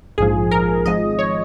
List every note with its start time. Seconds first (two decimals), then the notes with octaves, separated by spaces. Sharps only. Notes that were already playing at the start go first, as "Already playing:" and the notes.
0.18 A#1 G#2 F3 G#4
0.51 A#4
0.86 G#1 G#2 F3 G#3 D#5
1.19 C#5